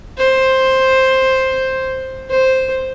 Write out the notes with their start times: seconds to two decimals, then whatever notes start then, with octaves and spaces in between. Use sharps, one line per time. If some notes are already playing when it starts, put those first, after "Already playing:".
0.17 C5
2.30 C5